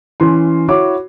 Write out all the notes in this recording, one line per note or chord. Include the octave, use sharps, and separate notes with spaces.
E3 C#4 C6
E4 F#4 C#5 D6